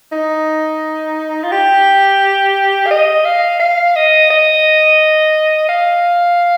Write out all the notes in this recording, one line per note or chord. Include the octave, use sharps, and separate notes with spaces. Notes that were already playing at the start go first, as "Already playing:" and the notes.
D#4
F4
G4
F5
D#5
F5
F5
D#5
D#5
F5